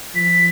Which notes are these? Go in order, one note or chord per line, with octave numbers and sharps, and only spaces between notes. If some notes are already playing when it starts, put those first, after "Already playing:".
F3 B6